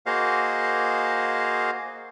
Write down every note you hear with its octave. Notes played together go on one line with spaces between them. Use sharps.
A#3 F#4 G#4 C5 D#5 F5